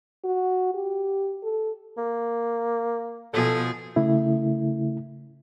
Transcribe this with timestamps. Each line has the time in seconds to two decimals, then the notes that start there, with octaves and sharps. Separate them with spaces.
0.25 F#4
0.75 G4
1.43 A4
1.97 A#3
3.33 B2 F3 G#4 A4
3.96 C#3 A3 E4